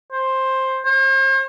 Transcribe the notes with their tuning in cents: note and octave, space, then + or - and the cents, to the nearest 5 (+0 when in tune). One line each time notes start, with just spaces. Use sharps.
C5 +10
C5 +45